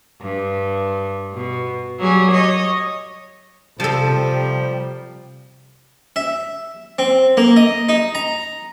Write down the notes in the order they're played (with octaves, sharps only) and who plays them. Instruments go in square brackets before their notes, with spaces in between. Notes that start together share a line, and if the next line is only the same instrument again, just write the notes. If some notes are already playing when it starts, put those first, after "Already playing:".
[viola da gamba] G2
B2
F#3 G3 G#4
C#5 D#5
[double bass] C3 [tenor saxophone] F3 [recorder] G3 [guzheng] A4 A5
[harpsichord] E5
C4
A#3
D#5
D#4
A#5